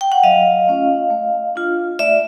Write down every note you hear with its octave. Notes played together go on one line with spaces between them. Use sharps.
G5
F#5
F#3 D#5 F5
A3 C#4 F4
A3
D4 F4
A3 D5 E5